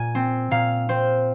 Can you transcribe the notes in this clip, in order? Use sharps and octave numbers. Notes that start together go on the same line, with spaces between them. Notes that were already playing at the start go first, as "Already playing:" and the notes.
Already playing: A#2 G#5
C4
A#2 F5
C4 C5